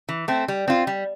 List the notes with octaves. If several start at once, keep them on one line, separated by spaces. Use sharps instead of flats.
E3
A3 C4
G3
C4 F4
G3